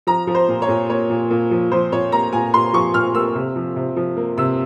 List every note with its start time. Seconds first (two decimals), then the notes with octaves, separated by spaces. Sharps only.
0.07 F3 A#5
0.27 F3
0.35 C5
0.49 A#2
0.62 C#5
0.69 A#2
0.89 A#3 C#5
1.10 A#2
1.30 A#2
1.51 F3
1.72 F3 C5
1.92 A#2 C#5
2.12 A#3 A#5
2.33 A#2 G#5
2.54 A#2 C6
2.73 F3 C#6
2.94 A#2 F6
3.15 A#3 E6
3.35 C3
3.56 F3
3.76 C3
3.96 F3
4.17 A#3
4.38 C3 E6